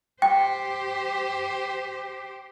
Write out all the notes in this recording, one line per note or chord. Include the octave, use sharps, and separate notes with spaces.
G4 C5 G5